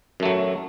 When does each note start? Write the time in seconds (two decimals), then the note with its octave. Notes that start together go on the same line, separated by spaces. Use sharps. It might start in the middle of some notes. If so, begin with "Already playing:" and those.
0.20 F#2
0.23 A3
0.25 F#3